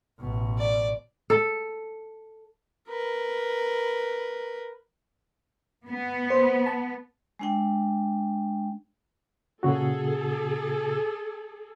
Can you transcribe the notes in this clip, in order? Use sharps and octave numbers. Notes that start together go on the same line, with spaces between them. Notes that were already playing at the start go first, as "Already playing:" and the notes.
A1 B2
D5
A4
A#4 B4
B3
C5
A5
G#3 D4 G5
A#2 C#3 F#4 G#4 A4